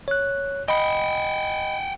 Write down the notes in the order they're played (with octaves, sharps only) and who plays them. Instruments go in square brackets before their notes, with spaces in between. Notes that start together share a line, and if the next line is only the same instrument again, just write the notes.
[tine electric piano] C#5 F#6
[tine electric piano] D#5 B5 [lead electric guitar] F#5 G5